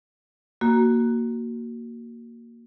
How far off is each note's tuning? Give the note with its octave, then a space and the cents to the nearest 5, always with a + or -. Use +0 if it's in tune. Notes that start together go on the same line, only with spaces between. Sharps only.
A#3 +0 F#4 +5